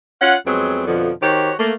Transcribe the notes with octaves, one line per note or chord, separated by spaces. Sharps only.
C#4 F4 F#5
F2 F#3 G#3 B3 C4
F2 B2 D3 F3
D#3 F#4 G4 C5 C#5
A3 A#3